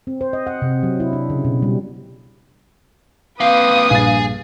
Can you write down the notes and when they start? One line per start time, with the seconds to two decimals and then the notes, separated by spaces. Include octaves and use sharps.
0.07 C4
0.21 C5
0.33 D#5
0.47 F#5
0.62 C3
0.83 F#3
1.00 E4
1.13 D4
1.30 C#3
1.44 B2
1.62 G3
3.40 A#3 C4 B4 F5 D#6
3.90 A#1 G2 G#4 G#5 A6